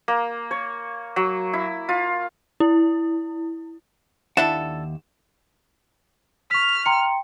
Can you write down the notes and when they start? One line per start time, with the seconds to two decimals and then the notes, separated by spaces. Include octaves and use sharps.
0.08 A#3
0.51 C#5
1.16 F#3
1.53 E4
1.89 F4
2.60 E4
4.37 D#2 D4 E4 A4 E5 F#5 E7
6.51 C#6 F6 B6
6.86 G5 A#5 C6 C#7